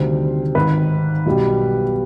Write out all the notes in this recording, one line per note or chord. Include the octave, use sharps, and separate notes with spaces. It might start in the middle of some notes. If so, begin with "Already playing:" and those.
Already playing: D2 C3 D#3 G3 C5
G#1 G#2 D#3 B4
B1 B2 G3